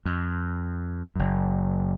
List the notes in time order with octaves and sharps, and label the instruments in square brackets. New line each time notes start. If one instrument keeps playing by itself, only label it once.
[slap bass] F2
F#1 F#2